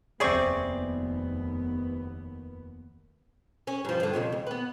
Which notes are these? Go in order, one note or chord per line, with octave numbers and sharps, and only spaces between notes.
F1 D#2 C3 B3 C4 G#4 D5 C#6
C#4
G2 F3
G2 D3
F2 A#2 C#3
D#2
B3 B4